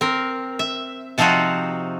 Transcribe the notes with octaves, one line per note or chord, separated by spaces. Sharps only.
C4 A#4
E5
C3 F3 C4 D#4 F4 F#4